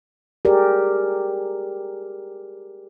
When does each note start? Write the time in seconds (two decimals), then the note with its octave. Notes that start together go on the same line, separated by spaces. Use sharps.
0.45 G4 G#4 A#4 D5